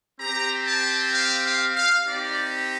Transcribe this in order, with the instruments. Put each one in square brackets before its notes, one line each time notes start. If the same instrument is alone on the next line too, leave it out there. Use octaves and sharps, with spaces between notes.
[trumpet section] C4 G4 A#5
A5
F5
F5
F5
C4 D#4 G4 D5